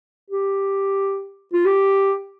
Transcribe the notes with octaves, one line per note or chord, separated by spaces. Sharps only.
G4
F4
G4